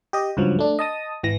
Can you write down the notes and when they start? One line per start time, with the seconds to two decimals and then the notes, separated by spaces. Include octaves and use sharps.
0.13 G4 D#5
0.37 C#2 G2 F3 F#3
0.59 A3 D4
0.79 D#5 A5 D#6
1.23 G#1 E3 A#6